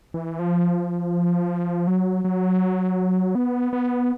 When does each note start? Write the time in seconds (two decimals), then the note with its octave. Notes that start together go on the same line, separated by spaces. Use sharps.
0.14 E3
0.39 F3
1.87 F#3
2.25 F#3
3.35 B3
3.73 B3